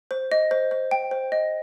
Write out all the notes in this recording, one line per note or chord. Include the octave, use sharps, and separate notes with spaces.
C5
D#5
C5
C5
G5
C5
D#5